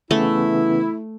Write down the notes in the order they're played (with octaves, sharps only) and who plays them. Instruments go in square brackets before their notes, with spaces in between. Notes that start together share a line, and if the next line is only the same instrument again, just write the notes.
[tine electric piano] C#3 E3 B3 [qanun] A3 [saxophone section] E4